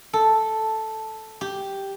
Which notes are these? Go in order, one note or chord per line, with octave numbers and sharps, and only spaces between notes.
A4
G4